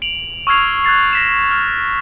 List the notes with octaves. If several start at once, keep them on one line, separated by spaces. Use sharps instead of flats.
D7 F7 F#7
C#6 E6 F6 G#6 C7 F7
F#6 G#6 A6 C7
A#6 B6 E7
F6